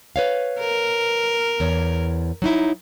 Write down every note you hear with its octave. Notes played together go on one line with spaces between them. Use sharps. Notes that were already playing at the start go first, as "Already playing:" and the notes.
B4 C#5 F5
A#4
E2 C#5
F#3 D#4 E4